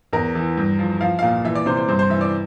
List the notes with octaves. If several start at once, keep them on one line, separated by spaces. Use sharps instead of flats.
E2 A#4
E3
G2
F3
F3 F5
A#2 F5
E3 E5
D5
C3 C5
C5
G2 C5
C5
E3 E5
D5